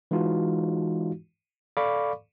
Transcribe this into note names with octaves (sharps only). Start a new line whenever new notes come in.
E3 G#3 D#4 F4 F#4
A4 D5 F5 B5 C#6 D6